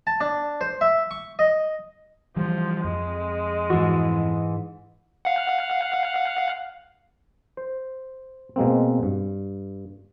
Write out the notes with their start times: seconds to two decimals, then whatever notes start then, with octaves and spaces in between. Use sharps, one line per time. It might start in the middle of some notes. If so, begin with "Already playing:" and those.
0.07 A5
0.21 D4
0.61 C5
0.81 E5
1.11 C#6
1.39 D#5
2.37 E3 F3 G3
2.84 F2 G#3
3.70 G#2 E3 F#4
5.25 F5 F#5
7.57 C5
8.56 B2 G#3 A#3 C4
9.03 G2